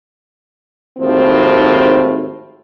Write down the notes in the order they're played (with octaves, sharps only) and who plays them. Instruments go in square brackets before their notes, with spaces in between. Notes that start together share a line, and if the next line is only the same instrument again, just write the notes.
[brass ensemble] G#1 D#2 A2 F3 C4